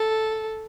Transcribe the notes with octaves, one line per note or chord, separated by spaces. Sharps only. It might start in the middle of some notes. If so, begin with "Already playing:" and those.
Already playing: A4